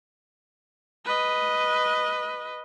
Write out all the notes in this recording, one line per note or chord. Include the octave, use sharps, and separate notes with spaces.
B4 D#5